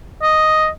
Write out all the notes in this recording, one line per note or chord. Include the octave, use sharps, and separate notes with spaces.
D#5